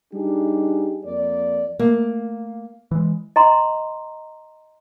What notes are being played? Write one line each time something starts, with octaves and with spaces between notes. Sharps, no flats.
G3 D4 D#4 G4 G#4
F2 A#3 D5
A3 A#3
E3 G#3
D#5 A#5 C6